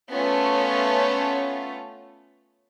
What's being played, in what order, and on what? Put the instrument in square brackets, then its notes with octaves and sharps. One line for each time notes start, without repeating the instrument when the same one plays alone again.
[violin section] A3 B3 C#4 F4